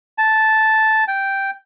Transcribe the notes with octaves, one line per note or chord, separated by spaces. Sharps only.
A5
G5